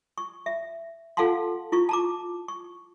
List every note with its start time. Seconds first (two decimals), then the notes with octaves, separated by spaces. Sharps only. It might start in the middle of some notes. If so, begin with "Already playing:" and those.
0.18 C#6
0.46 E5
1.17 F4 A4 F5 F#5 A5 C6
1.72 E4 F4 C#6
1.89 A5 A#5 D6
2.48 C#6